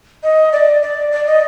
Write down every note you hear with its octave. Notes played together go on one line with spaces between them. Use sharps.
D#5
D5
D5
D5
D#5